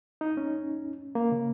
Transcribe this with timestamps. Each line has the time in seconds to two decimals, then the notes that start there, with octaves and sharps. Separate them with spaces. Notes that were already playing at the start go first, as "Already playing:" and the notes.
0.21 D#4
0.37 C#4
1.15 A#3
1.32 C#3